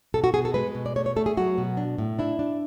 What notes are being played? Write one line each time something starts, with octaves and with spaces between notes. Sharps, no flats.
B2 A4
F#4
B2 G#4
A4
G#3 B4
B2
D5
A3 C#5
C#5
A3 A4
G#4
F#3 F#4
B2
D4
A2
D4 E4
D4